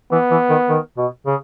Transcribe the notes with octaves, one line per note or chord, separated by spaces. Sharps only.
E3 B3
E3
D#3
D#3
B2
C#3